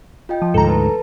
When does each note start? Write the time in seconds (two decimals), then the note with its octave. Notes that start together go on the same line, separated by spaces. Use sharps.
0.29 F4 D#5 G5
0.42 F3
0.54 D2 G#2 A4 A#5
0.68 B4 A5